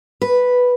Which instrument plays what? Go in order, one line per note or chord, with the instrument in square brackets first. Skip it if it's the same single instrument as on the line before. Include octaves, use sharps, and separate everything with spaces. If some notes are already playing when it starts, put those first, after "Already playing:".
[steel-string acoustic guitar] B4